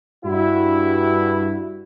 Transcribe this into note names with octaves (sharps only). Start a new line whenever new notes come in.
G2 E4 F#4